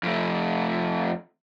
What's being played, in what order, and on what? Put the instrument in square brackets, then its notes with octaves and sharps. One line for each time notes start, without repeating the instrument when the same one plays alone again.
[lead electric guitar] F2 A3